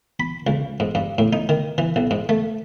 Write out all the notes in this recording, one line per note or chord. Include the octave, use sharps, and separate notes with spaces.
B5
C#2
G#2
G2
A2
D#4
D#3
E3
B1
G#2
A3